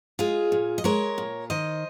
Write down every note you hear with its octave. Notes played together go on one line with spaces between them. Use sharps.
G#3 F4 G#4
A#2
D#5
G#3 A#4 C#5
A#2
D#3 C5 D#5